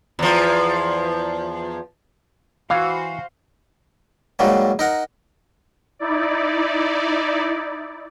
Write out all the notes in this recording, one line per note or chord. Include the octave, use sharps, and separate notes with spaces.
E2 F3
E3 F#4 C5 F5
G#2 F#3 G3 A#3
D#4 A#4 F#5
D#4 E4 D5